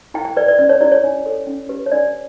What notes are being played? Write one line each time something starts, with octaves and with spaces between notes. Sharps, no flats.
E4 G5
G5
B4 D5
D5
C#4 D5
C#5
E4 G4 C#5 D5
C#5
D4
A4 C#5
C#4
G4 B4
C#5
D4 D5